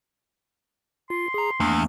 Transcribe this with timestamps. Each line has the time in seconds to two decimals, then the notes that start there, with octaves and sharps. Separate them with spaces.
1.10 F4 C6
1.34 G#4 A#5
1.60 E2 A3 A#3 D4